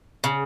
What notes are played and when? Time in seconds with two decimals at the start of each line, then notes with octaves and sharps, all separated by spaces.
0.24 C#3